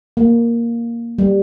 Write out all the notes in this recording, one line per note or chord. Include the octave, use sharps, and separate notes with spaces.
A#3
G3